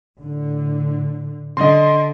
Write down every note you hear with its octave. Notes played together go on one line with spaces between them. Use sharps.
A2 D3
D3 D#5 C6